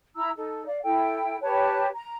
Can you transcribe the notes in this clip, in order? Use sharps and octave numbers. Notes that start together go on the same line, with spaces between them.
E4 A#5 E6
D#4 A4
D5 F5
E4 A4 G5
G4 B4 C#5 A5
A#5